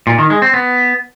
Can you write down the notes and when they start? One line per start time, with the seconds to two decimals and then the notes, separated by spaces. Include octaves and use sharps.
0.07 A#2
0.18 D#3
0.30 G#3
0.42 C4
0.54 B3